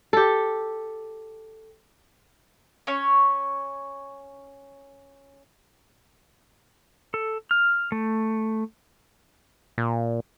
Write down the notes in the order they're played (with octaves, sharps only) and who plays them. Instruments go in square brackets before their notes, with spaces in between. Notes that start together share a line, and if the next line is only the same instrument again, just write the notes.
[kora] G4 A4
[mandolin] C#4 C#5
[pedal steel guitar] A4
F6
A3
[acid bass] A#2